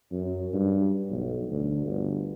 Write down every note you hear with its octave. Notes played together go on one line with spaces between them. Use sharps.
F#2
G2
B1
D2
G1